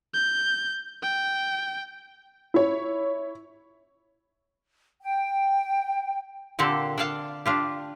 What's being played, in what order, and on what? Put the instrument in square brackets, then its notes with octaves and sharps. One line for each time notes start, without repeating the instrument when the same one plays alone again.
[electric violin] G6
G5
[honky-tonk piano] E4 C#5
[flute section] G5
[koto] A#2 D3 C4 G4 A4
D4 A4 D5 F5 A5
D4 F4 G4